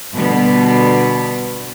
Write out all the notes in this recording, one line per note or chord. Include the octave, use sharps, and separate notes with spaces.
B2 D3 G3 B3